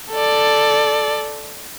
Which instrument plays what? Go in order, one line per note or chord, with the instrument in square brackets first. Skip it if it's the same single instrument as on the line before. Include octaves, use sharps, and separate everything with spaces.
[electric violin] A4 D5